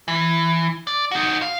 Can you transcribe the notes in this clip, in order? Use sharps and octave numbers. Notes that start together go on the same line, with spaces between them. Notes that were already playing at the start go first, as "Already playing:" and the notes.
E3
D5
D#4 F#4
F5